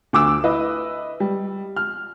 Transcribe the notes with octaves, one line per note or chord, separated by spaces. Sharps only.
D2 D6 E6
E4 B4 D#5
G3
F6